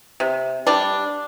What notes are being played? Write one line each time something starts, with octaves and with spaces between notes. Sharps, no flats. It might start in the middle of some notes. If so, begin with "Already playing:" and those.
C3
G3 D4